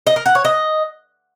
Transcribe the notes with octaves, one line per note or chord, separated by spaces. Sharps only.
D#5
A#4
F#5
C#5
D#5